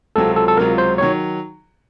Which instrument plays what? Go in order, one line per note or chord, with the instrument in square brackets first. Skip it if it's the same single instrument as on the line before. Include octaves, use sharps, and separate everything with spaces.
[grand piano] C#2 C3 F#3 C4 F4 [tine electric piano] A4
[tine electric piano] A4
A4
[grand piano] C#2 C3 F#3 C4 F4 [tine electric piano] A#4
[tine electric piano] C5
[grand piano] D#3 F#3 [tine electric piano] C#5